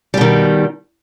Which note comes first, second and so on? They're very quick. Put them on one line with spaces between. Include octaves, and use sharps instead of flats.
G3 B2 D#3